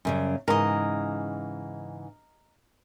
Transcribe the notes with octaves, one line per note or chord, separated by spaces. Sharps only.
F#2 C#3 G3
G#2 C#3 E3 A#4 D#5